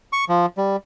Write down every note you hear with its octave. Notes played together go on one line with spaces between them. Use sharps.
C#6
F3
G3